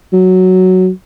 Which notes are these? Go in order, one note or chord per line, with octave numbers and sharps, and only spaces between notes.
F#3